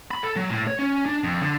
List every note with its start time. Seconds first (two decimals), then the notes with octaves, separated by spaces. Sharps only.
0.11 B5
0.23 A4
0.36 F#3
0.50 A2
0.67 C#5
0.79 C#4
1.06 D4
1.24 F2
1.42 D3